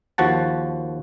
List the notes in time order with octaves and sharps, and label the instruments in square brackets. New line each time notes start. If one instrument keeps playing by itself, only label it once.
[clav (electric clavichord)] D#2 F3 F#4 F#5 A5